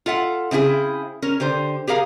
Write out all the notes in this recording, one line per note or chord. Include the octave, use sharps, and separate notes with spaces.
F4 A4 E5 F#5
C#3 C4 E4 G4 G#4
C#4 A#4
D3 G4 C5
G4 G#4 A#4 F5